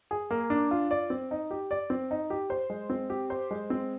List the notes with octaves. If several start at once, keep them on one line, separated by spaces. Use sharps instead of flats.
G#4
A#3
D4
F4
D5
C4
D#4
G4
D5
C4
D#4
G4
C5
G#3
C4
G4
C5
G#3
C4